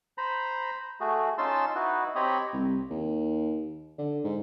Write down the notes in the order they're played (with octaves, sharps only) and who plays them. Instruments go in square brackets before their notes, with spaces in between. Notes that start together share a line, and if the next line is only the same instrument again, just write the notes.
[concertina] C5 A#5 B5
A3 F#4 G#4
C#4 D#4 F4 A5 C6 E6
D#4 E4 F#4 B4
C4 G4 C#5 D#5 A#5 B5
[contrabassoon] C2
D#2
D3
G#2